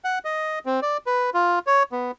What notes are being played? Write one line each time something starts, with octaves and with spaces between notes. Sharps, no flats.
F#5
D#5
C4
D5
B4
F4
C#5
B3